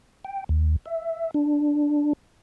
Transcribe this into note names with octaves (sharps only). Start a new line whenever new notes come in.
G5
D#2
E5
D4